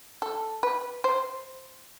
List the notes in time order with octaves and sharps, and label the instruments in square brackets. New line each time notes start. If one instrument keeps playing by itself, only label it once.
[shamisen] A4
B4
C5